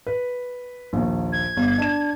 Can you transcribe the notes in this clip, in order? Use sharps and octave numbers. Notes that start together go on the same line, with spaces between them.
B4
A#1 D#2
G#6
G1
D4 E7